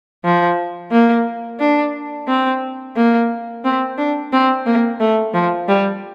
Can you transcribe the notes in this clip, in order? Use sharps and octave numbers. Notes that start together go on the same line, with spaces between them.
F3
A#3
D4
C4
A#3
C4
D4
C4
A#3
A3
F3
G3